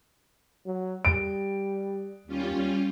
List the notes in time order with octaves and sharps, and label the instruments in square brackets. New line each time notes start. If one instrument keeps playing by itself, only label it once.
[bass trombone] F#3
[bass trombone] G3 [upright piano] D7
[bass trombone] D#2 [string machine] G3 C#4 F4